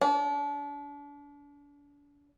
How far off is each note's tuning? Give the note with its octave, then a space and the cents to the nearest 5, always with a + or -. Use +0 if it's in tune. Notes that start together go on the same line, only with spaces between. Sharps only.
D4 -35